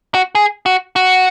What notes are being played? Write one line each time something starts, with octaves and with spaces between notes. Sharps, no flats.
F#4
G#4
F#4
F#4